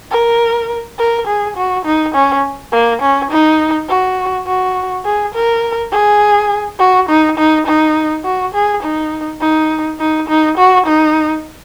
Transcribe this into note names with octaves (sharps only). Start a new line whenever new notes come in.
A#4
A#4
G#4
F#4
D#4
C#4
A#3
C#4
D#4
F#4
F#4
G#4
A#4
G#4
F#4
D#4
D#4
D#4
F#4
G#4
D#4
D#4
D#4
D#4
F#4
D#4